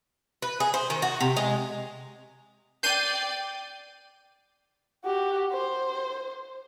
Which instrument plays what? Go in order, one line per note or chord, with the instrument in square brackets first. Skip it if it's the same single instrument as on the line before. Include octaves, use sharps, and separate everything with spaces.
[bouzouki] B4
G#4
C5
D#3
F#4
C3
G#3
[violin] D5 G5 [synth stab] G6 C7 D#7
[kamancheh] F#4 G4
C5